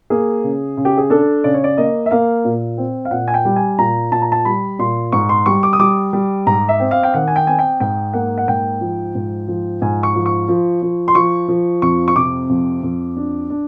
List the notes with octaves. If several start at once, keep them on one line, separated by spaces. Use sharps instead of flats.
A#3 G#4
C#3
C#3
G4
G#4
D4 A4
C#3 D5
C#5
D5
A#3 D#5
E5
A#3 F5
A#2
C4
F5
A#2 F#5
G#5
G5
G3
G#5
A#2 A#5
A#2 A5
A#5
A5
G3 B5
A#2 C6
G#2 C#6
C6
G3 C#6
D6
D#6
G3 D6
G3
G#2 A#5
E5
C4
F5
G5
D#3 F#5
G#5
G5
C4 G#5
G5
G#2 G5
A#3 F#5
F#5
G#2 G5
F3
G#2
F3
G#2 G#5
C#6
F3
C#6
F3
F3
C6
F3 C#6
F3
F2 C#6
C#6
C3 D6
F2
F2
D4
D4